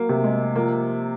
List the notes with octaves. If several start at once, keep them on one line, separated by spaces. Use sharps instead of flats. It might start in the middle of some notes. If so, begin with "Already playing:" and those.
Already playing: F#3 A#3
C3
G#3
F3 A#3